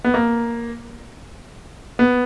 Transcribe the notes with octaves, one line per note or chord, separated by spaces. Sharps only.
B3
A#3
B3